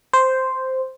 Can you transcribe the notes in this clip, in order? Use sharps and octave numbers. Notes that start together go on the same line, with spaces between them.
C5